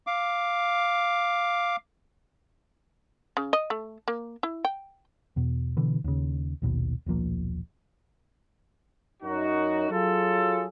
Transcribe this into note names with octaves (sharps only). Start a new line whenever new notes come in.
F5 D6
C#3
D#5
A3
A#3
E4
G5
E2 B2
B2 D3 E3
D#2 C#3
A#1 D#2 B2
D#1 B1 F3 A#3
F#2 D#4 F#4
F#3 F4 G#4 A4